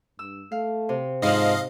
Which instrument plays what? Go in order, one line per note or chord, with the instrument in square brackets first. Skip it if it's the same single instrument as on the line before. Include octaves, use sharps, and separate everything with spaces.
[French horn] G2 [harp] E6
[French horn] A3 [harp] F5
[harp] C3
[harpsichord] G#2 F3 [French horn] D#4 [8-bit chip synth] D#5 F5